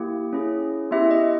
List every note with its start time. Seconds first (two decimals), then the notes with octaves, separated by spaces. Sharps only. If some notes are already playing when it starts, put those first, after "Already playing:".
Already playing: A#3 E4 G4
0.33 C#4 E4 G#4
0.91 B3 E4 G4 E5
1.11 D#5